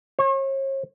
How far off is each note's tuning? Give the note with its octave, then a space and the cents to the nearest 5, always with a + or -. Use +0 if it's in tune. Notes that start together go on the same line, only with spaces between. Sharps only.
C#5 -40